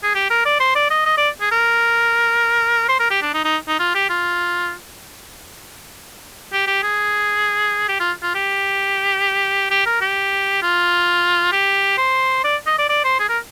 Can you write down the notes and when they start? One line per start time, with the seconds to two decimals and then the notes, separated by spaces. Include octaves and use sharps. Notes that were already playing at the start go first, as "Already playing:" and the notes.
0.03 G#4
0.15 G4
0.30 A#4
0.45 D5
0.60 C5
0.75 D5
0.90 D#5
1.06 D#5
1.17 D5
1.41 G#4
1.51 A#4
2.88 C5
2.99 A#4
3.10 G4
3.22 D4
3.34 D#4
3.45 D#4
3.68 D#4
3.79 F4
3.94 G4
4.09 F4
6.53 G4
6.67 G4
6.83 G#4
7.89 G4
8.00 F4
8.22 F4
8.35 G4
9.71 G4
9.86 A#4
10.01 G4
10.62 F4
11.52 G4
11.98 C5
12.44 D5
12.67 D#5
12.78 D5
12.89 D5
13.04 C5
13.19 G#4
13.29 A#4